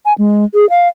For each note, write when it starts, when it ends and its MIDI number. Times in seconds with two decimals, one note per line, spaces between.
0.06 0.13 80
0.18 0.45 56
0.55 0.68 68
0.70 0.88 77